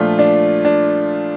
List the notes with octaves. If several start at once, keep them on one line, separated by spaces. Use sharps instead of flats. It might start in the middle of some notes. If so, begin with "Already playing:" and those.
Already playing: A#2 F3 A3 D4 F4
D4
D4